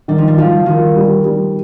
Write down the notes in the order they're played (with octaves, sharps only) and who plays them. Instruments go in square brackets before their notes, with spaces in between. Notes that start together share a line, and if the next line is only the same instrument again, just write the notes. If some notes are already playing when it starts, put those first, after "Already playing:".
[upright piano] D#3 [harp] G3
[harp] F3
G3
[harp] F3 [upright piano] F4
[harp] D#3 [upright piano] F4
[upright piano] G3
G3